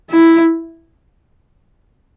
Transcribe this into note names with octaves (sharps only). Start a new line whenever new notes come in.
E4